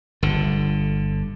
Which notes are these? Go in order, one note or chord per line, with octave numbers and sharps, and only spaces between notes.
G1 D3